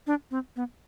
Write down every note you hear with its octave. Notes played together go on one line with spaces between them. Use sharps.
D4
C4
B3